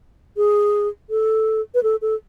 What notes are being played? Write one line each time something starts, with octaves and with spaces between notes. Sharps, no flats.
G#4
A4
B4
A4
A4